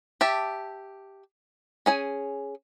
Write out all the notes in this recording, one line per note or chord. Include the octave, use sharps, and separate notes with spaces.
G4 E5 A5
C#4 G#4 G#5